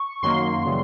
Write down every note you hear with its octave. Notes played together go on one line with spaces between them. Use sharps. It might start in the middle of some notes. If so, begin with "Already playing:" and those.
Already playing: C#6
F#2 D#3 F#3 A#3 C6
C#3 E3 G3